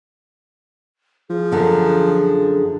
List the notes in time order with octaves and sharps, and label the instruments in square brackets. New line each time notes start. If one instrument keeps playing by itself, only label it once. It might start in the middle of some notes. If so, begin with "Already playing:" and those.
[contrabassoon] F3 [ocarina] G#4
[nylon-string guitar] F#2 D3 D4